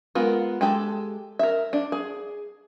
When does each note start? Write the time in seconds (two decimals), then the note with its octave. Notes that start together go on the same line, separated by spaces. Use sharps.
0.15 G#3 B3 F4 A#4
0.61 G#3 G4 A4
1.39 A#4 E5
1.73 D4
1.92 G#4